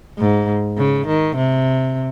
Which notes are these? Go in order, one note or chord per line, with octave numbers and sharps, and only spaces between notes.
G#2
C#3
D#3
C3